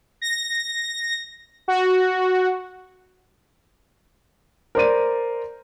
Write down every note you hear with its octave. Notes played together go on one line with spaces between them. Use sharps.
A#6
F#4
A#4 C5 D5 D#7